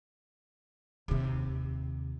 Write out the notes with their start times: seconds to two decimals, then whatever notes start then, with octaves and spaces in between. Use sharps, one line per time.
1.08 D#2 C3